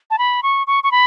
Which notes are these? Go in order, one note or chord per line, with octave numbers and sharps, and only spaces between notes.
A5
B5
C#6
C#6
C#6
B5